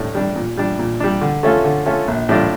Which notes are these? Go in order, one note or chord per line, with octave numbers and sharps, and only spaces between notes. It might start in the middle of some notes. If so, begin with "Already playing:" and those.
Already playing: A2 G3 D4
G3 D4
A#2
G3 D4
A#2
G3 D4
D3
A3 C#4 F4 A4
D3
A3 C#4 F4 A4
A#1
A2 G3 D4 F4